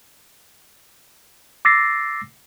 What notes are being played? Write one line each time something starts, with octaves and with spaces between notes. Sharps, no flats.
D6 E6 A6 A#6 C7